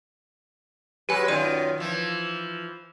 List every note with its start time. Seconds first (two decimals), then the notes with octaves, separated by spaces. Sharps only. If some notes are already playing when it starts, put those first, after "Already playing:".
1.09 F#3 G#3 G4 B4 G#5
1.28 F#2 D#3 F4 D5 D#7
1.78 E3 F3